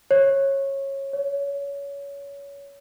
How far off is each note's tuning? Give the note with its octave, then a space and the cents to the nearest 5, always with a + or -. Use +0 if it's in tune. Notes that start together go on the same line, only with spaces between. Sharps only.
C#5 -20
C#5 +25